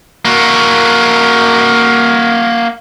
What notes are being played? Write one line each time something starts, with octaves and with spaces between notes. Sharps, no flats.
A#3 F#4